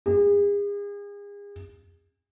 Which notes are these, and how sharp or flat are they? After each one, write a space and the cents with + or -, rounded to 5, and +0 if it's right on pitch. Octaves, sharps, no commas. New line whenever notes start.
G#4 -40